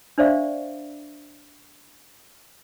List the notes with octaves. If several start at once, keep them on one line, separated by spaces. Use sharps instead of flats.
D4 C5 D5 E5 F5 C#6